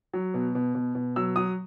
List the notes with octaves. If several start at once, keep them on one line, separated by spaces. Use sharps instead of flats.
F#3
B2
B2
B2
B2
F#3 E6
F#3 D#6